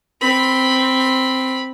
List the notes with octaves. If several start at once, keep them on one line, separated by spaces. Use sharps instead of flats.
C4 B5